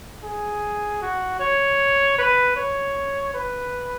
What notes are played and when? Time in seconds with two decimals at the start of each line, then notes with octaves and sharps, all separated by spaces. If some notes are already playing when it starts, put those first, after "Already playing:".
0.23 G#4
1.02 F#4
1.40 C#5
2.18 B4
2.56 C#5
3.34 B4